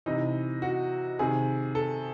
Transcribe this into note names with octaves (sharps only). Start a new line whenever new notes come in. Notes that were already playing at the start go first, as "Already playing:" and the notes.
C3 E3 D#4
F#4
C3 D#3 G#4
A4